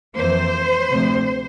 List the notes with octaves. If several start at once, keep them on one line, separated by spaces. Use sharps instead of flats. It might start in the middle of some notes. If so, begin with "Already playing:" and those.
F2 E3 A#3 C5
D2 C3 F3